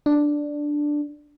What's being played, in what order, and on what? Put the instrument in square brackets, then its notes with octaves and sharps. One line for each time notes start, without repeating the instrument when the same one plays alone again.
[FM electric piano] D4